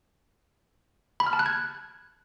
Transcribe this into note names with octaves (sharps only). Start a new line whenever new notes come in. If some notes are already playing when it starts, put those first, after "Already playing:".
B5
F6
A5
F#6
G#6